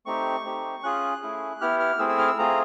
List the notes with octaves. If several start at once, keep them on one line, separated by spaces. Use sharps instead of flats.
A3 C4 D#4 G4 C#6
A3 C4 D#4 G4
C#4 F4 G#4 F#6
A3 C#4 E4 G#4
B3 E4 G4 F6
F6
A3 C4 E4 G#4 E6
E6
F6
E6
A3 C4 F4 G#4 A#5